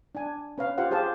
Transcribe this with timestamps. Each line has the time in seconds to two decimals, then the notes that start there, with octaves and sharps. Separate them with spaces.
0.15 D4 G#5
0.58 C#4 B4 C#5 F5
0.78 F4 G4 C5 F5 F#5
0.91 G4 G#4 C5 F5 A5